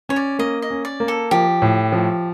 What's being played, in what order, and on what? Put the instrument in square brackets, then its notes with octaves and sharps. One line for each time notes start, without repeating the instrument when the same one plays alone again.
[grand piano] C#4 [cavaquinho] C#5
[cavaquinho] D5
[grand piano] A#3 [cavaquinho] D#5
[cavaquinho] D#5
[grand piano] C#4
[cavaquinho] D5
[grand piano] A#3
[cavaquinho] A4
[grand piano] F3 [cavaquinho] G4
[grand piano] A2
F3